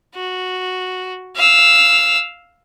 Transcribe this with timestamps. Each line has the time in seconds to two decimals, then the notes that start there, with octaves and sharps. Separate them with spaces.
0.15 F#4
1.36 F5 E6